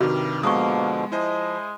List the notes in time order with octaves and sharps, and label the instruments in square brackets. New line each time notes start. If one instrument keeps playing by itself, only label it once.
[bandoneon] G2 G3 F6 [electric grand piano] C3 D#3 [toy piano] F#4 [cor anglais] D5
[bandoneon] B2 D3 F3 [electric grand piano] G#3 B3 [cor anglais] A#3 [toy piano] C#6 D#6
[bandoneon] F3 [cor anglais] G#3 [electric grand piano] E4 C5 D#5